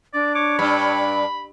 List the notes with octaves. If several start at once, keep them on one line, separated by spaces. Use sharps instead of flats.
D4 D5
C#5 D6
G2 B5